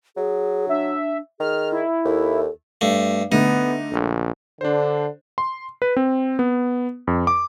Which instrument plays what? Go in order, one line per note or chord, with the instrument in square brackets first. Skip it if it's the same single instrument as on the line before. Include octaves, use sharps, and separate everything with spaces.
[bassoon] F#3 [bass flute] G#4
[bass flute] D4 [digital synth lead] E5
[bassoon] D#3 [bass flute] G#4 [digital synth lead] F6
[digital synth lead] E4
[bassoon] D#2 [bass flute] A4
[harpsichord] G2 A3
[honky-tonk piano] D3 A3 [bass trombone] B3 [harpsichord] D#4
[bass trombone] A#1
[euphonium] D3 [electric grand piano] D4 C5
[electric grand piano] C6
B4
C4
B3
F2
D6